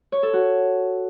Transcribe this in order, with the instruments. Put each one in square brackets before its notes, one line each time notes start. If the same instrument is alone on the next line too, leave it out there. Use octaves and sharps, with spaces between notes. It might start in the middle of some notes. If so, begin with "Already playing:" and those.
[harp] C#5
A4
F#4